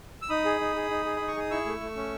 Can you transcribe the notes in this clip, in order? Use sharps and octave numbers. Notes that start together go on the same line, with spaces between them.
E6
D#4 B5 D#6
G#4
D#4
G#4
D#4
G#4
D#4 B5
C#6
G#4 D#6
E4 C#6 E6
A3
A3
C#4